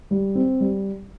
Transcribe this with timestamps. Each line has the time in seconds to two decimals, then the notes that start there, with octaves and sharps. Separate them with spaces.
0.11 G3
0.35 C4
0.60 G3